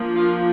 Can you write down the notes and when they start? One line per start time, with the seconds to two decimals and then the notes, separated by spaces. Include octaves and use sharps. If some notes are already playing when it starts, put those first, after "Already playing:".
Already playing: F3 A#3 D4
0.16 F4